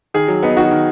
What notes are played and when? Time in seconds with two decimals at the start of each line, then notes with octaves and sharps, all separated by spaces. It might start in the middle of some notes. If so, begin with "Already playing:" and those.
0.14 D#3 G#4
0.28 F#3
0.43 B3 D#4
0.57 D#3 F#4
0.71 D#3